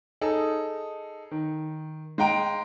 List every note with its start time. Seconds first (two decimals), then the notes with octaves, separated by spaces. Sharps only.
0.21 D#4 G#4 A4
1.31 D#3
2.18 G#3 F5 G5 A#5 D7